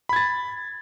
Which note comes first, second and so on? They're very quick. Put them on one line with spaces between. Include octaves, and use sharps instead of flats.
B5 G#6 A6